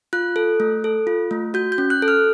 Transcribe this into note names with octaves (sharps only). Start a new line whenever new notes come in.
F4 F#6
A4
A3
A4
F4
A3
F#4 G6
G6
C#4
F#6
A4
F6